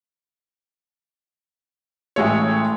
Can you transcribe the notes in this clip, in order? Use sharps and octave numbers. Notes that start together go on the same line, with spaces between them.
A1 G#3 A3 C#5